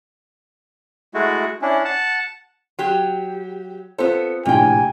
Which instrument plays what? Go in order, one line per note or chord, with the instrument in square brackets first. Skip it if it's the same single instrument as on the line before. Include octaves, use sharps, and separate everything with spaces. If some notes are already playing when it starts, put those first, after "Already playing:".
[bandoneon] G#3 A3 E4 F#4
C#4 D4 E4
F#5 A5
[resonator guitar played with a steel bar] F#3 G4
[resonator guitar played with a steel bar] B3 A4 [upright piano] C4 F4 C5
[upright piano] A#1 A2 C3 [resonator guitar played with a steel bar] F2 G5 [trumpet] G#5